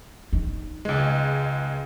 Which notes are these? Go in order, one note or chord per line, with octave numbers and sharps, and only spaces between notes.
D#4
C#2 G#3